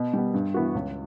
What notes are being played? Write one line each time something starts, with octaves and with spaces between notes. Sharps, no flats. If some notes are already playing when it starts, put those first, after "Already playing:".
Already playing: B2
G3 B3
G2
E3 B3 F#4
C#2